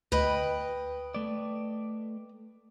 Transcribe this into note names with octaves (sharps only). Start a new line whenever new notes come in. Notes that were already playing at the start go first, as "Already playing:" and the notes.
D2 B4 D#5 G5
A3 D5